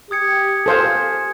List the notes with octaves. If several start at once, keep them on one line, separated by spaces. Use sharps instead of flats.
G4 D#6 G#6 C#7
A4 C5 F5 G#5 G#6